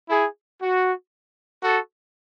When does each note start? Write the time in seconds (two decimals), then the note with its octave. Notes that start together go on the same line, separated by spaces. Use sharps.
0.09 E4 G#4
0.61 F#4
1.63 F#4 A4